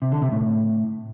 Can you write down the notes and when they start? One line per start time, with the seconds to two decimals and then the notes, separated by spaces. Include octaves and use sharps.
0.02 C3
0.12 D3
0.22 C3
0.32 A2